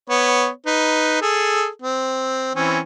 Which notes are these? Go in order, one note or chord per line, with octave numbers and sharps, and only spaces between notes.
B3 C#5
D#4 B4
G#4 A4
C4
E3 C4 C#4